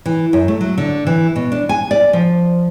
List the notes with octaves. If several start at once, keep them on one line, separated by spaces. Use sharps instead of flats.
E3
F#2
A3
F#3
D3
E3
B2
D4
G#5
D5
F3